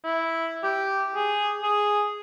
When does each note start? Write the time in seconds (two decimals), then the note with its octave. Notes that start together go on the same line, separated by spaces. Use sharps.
0.04 E4
0.64 G4
1.15 G#4
1.63 G#4